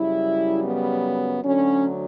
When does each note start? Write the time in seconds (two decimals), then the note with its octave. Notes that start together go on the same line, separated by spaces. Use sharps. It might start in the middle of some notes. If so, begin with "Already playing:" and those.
Already playing: F#2 C#3 G3 E4
0.64 B3
1.44 D2 D3 F#3 C#4